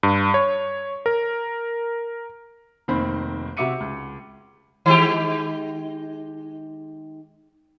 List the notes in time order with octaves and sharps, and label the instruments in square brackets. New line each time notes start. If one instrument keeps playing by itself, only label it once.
[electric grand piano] G2
C#5
A#4
[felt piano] F1 D#3 A#3 C4 C5 B5
C3 F#4 E5 D6 C#7 D#7
C#2
[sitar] D#3 G#3 G4